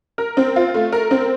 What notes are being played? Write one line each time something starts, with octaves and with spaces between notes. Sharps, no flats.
A#4
C4
F4
A3
A#4
C4